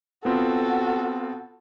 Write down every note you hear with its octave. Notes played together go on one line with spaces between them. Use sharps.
B3 C4 F4 F#4 A4